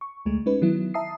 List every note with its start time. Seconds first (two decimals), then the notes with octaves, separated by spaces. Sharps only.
0.01 C#6
0.26 D2 G#3 A3
0.46 G#3 C#4 D#4 B4
0.62 D#3 F#3 B3 E4
0.94 E5 A5 A#5 D#6 C7